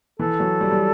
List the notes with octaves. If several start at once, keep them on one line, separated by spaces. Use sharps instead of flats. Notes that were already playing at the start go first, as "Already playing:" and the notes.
E3 A4
F#3
G3
G3